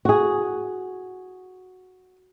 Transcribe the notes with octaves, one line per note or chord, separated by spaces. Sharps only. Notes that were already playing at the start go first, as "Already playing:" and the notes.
F#4 G#4